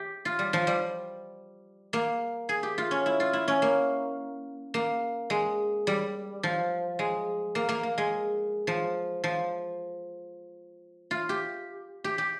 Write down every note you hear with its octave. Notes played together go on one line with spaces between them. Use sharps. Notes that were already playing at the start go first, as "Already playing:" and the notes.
Already playing: G4
F4
G3
F3
G3
A#3
G#4
G4
F4
C#4
E4
F4
E4
C#4
A#3
A#3
G#3
G3
F3
G#3
A#3
A#3
A#3
G#3
F3
F3
F4
G4
G4
G4